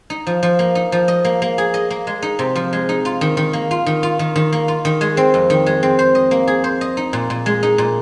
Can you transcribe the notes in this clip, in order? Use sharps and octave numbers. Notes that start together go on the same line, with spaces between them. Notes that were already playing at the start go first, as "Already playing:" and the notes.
D#4
F3
F3
A#3
D#4
F3
D#5
A#3
A#3
G#4
D#5
A#3
G#3
D#4
C3
F3
G#3
D#4
F4
D#3
D#3
A#3
F4
D#3
F4
D#3
D#3
A#3
F4
D#3
G#3
C4
F2
D#3
G#3
C4
C5
D#5
A#3
G#4
C5
D#5
D#4
A#2
A#2
G#3
D#4
A#2